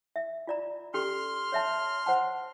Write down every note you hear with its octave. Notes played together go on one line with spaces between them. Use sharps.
E5
F4 D5 A#5
C#4 G4 A4 C6 F6
C#5 E5 A5
C5 F#5 A5